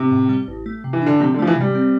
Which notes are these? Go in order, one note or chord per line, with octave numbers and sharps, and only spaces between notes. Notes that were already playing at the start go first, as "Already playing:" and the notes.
Already playing: C3
A2
G3
A1
A3
C3
E3
D3 D4
C3 F3
D3
F3 A3
E3
C3 G3
C4